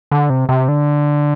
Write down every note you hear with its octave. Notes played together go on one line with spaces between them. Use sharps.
D3
C3
C3
D3